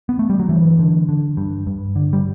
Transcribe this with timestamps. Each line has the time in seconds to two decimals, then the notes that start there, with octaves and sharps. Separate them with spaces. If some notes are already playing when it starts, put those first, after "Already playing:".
0.09 B3
0.19 A3
0.30 G3
0.40 F#3
0.49 G2 E3
0.79 D3
1.09 D3
1.37 G2
1.67 G2
1.96 D3
2.13 G3